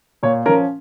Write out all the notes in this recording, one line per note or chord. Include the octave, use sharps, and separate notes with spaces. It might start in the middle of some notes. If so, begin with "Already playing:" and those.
A#2 C#5
F3 C#4 A#4